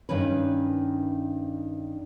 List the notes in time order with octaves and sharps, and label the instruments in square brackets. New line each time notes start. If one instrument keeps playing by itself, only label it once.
[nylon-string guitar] G2 D#3 C#4 B4